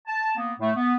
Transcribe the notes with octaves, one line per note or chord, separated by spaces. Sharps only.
A5
A#3 B3
A2 A3
B3